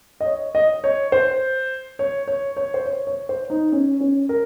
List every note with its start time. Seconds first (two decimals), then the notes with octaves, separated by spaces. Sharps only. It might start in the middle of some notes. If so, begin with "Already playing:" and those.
0.20 D#5
0.26 C#5
0.55 D#5
0.84 C#5
1.12 C5
1.99 C#5
2.28 C#5
2.57 C#5
2.74 C5
2.86 C#5
3.07 C#5
3.29 C5
3.50 D#4
3.72 C#4
4.01 C#4
4.29 A#4